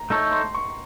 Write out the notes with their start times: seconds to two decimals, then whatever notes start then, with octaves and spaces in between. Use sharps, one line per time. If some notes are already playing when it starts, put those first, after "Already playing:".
Already playing: A#5
0.10 A3 D#4 A4 C#5
0.32 C6
0.55 C#6